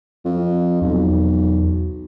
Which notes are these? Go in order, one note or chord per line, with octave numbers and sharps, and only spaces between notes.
F2
B1 E2